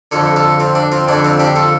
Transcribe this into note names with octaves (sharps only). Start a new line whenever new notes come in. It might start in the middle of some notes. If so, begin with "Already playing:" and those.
F2 D3 F4 A4
F4 A4
C4 F4
D4
C4 F4
F2 D3 D4
C4 F4
D4 G4
F4 A4